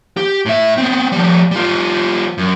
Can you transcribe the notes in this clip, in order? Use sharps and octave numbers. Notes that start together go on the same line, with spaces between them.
G4
A2 E5
B3 C4
F3 G3
G3 F4
F#2